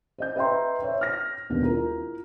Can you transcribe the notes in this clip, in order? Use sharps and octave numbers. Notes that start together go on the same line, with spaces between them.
C5 D#5 G6
B4 D#5 E5 G5 A#5 C6
C5 C#5 E5
F6 A#6
E1 D#2 B3 D4
E4 F4 A#4 A#5